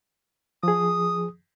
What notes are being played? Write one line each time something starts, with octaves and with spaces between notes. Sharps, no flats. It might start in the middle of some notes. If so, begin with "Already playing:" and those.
F3 G#4 D#6